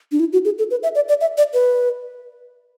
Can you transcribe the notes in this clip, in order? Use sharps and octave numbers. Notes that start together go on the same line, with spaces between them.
D4
E4
F#4
G#4
A4
B4
E5
D5
D5
E5
D5
B4